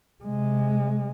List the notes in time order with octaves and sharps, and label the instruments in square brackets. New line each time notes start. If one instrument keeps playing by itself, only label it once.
[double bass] C3 G#3